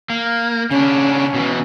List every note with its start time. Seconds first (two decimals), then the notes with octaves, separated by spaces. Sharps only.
0.10 A#3
0.71 C#3 C#4 D4
1.34 B2 D#3 E3